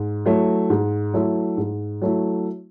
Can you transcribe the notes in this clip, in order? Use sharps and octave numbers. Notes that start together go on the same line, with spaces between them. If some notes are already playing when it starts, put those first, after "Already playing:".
Already playing: G#2
F#3 A3 E4
G#2
F#3 A3 E4
G#2
F#3 A3 E4